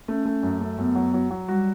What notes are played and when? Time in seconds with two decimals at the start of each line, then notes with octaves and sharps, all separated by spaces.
0.08 A3 C#4
0.25 A3
0.43 F#2
0.61 A3
0.78 F#2 B3
0.95 F#3
1.14 F#3
1.31 F#3
1.48 G3 F#4